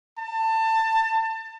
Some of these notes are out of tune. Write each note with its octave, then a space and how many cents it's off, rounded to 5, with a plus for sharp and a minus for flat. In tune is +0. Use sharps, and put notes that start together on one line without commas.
A5 +25